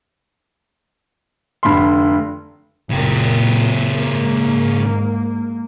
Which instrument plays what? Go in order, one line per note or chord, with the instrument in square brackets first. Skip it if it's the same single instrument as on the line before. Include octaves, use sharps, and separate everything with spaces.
[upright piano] F1 D3 B5 C6
[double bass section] F#1 A#2 [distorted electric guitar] C#3 G4
[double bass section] G#2 A#3